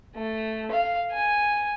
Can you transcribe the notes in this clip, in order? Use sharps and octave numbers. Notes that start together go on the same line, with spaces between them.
A3
F5
G#5